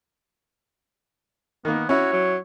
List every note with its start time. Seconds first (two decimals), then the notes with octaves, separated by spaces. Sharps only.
1.65 D#3 A#3 B3
1.89 C#4 E4 F#4 C#5
2.13 F#3